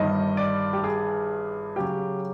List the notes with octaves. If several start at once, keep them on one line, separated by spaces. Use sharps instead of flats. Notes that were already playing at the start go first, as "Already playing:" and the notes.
Already playing: G1 G2 D#3 G3 D#5
D5
G4
G#4
C#3 F#3 G4